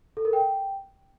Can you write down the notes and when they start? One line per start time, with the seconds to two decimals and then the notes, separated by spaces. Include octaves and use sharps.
0.17 A4
0.25 A#4
0.33 G5